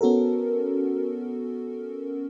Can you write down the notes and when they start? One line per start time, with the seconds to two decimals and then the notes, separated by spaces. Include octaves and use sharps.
0.01 B3 C#4 F#4 A4 A#4